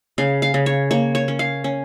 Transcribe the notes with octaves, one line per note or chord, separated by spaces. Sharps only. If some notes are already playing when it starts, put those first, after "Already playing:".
C#3 F5
F5
C#3
C#5
A#3 C#5
C#5
C#4
F5
C#4